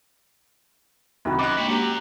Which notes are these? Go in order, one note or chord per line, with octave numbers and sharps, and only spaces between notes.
C2 D#3 F#4 F#5 B5
F#2 D#5 D6 F#6
G#3 A#3 D4 B4 C#5 G5
F#3 C#4 G4 G5 A#5